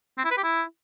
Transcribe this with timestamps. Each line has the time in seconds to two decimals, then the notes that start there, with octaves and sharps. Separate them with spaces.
0.18 C4
0.24 E4
0.31 B4
0.37 G4
0.43 E4